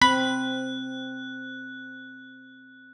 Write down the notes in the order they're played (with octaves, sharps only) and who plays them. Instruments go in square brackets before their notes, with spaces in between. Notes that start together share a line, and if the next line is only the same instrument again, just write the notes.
[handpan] C4 [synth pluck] B5 [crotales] F#6